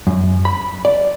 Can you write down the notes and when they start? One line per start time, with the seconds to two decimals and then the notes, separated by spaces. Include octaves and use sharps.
0.07 F#2
0.45 B5
0.85 D5